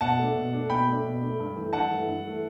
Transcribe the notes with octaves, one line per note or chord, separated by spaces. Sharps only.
B2 F#5 A5
A3 D4
B2
A3 D4
B2 G5 B5
A3 D4
B2
A3 D4
G2
E3 A3
G2 F#5 A5
E3 A3
G2
E3 A3